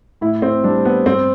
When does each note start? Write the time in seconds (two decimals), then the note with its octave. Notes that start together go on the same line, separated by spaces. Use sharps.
0.21 A2 E4
0.42 C4
0.64 G3 D4
0.85 B3
1.06 G2 C4